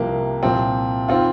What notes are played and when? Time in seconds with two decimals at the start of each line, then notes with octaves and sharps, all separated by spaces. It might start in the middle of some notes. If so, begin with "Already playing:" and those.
Already playing: C2 C3 F3 A#3
0.43 C2 A#2 F3 C4
1.08 D#3 C4 F4